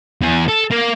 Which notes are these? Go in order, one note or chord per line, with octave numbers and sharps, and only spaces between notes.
E2 G#4
A4
A#3